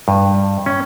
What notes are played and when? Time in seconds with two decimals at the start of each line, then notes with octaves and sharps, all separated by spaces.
0.08 G2
0.66 C#4